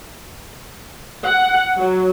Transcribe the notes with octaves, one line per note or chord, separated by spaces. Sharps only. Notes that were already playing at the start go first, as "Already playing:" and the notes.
F#5
F#3